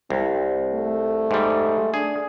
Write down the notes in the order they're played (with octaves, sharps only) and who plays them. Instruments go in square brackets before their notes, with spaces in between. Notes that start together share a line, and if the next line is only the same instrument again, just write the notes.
[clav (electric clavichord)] C2 [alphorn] C4
[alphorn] A3
[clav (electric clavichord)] G#2 G3
[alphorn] D4 [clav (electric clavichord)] G#4